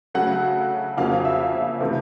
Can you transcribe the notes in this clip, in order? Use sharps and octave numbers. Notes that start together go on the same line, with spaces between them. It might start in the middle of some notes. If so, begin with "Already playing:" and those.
C#3 F#3 A3 F#5
F2 C#3 F#3 A#3 F5
E5
C3 E3 A3